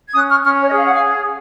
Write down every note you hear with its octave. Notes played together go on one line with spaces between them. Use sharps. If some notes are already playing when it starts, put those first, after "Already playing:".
G#6
C#4 D#6 F#6
C#6 F6
C#4 C#6 F6
C#5
D#5
G#4 F5
F#5
F5 G#5